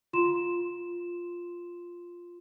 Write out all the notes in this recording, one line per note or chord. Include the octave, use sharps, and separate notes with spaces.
F4 C6 E7